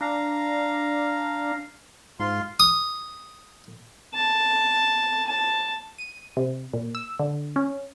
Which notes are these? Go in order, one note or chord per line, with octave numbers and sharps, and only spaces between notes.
D4 F5 A#5
G#2 F4 C6
D#6
A5
A5
D#7
C3
A#2
E6
D3
C#4